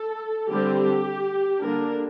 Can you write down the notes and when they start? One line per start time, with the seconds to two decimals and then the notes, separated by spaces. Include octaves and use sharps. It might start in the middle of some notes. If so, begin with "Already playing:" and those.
Already playing: A4
0.49 D3 G3 C4 G4
1.61 D3 G3 A#3 D4 A#4